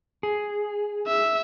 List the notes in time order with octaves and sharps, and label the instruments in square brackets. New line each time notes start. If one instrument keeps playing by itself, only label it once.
[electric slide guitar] G#4
[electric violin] E5